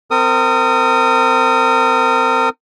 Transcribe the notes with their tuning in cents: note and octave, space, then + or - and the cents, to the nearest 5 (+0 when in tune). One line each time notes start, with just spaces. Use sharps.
C4 -25 A#4 -35 D#6 +0